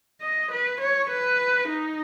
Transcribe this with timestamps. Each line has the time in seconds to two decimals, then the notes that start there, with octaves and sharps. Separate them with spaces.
0.22 D#5
0.51 B4
0.80 C#5
1.10 B4
1.68 D#4